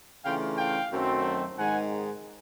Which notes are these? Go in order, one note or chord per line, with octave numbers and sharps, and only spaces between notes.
C#3 E3 A3 D4 F4 F5 G5
F5 G5
F#2 D#3 F#3 A3 C4
G#2 D#3 G#3 F#5 G#5